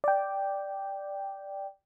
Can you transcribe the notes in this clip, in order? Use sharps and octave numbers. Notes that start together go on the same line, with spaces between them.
D5 G5